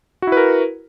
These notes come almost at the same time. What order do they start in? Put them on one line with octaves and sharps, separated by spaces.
F#4 E4 B4 A#4